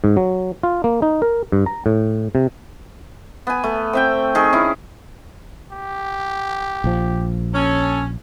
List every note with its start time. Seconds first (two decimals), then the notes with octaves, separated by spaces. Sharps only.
0.04 G#2
0.17 F#3
0.63 F4
0.84 A#3
1.02 D#4
1.22 A#4
1.52 G2
1.66 A#5
1.86 A2
2.35 C3
3.47 B3 G#5
3.64 A3
3.93 C4 E5 G5
4.35 D#3 G#4
4.53 C#4 E4
5.71 G4
6.84 A#1 F3
7.54 C#4 A4